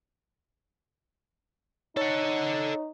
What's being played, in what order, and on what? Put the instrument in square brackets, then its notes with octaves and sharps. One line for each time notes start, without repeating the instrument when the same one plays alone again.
[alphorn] D#4 [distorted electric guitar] A4 F#5 [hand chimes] C#5